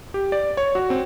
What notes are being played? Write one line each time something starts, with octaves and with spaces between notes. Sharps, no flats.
G4
D5
C#5
F#4
C4